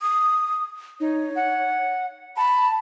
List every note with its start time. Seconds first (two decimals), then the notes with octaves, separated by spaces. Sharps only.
0.02 D#6
1.00 D#4 C#5
1.36 F#5
2.37 A5 B5